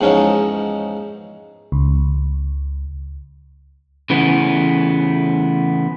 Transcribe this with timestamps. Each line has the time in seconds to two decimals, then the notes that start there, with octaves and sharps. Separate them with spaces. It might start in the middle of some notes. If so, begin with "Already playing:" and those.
0.01 E2 G#2 F3 C#4 D#4
1.72 C#2
4.10 C#3 E3 A3 B3